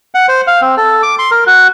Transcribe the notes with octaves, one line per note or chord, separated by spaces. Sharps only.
F#5
C5
F5
C4
A4
D6
C6
A#4
F#4